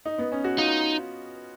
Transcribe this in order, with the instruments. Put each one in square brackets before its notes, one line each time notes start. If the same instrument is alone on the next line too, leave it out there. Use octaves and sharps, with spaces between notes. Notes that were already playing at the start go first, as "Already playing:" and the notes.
[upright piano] D#4
B3
C#4
F#4
[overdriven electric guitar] D#4 [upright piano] F4